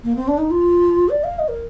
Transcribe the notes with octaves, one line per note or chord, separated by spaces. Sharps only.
A#3
C4
D4
D#4
F4
D5
F5
D#5
A#4